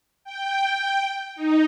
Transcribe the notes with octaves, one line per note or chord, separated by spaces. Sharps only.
G5
D#4